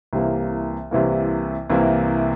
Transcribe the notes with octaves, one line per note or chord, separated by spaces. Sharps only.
C2 C3 E3 A#3
C2 C3 E3 A#3
C2 C3 E3 A#3